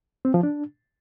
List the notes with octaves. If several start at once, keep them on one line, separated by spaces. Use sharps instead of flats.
C4
F3
D4